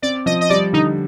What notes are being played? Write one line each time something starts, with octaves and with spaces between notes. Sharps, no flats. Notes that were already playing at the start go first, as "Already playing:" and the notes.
C4 D5
F3 D#5
D#5
G3 D5
D3 D#4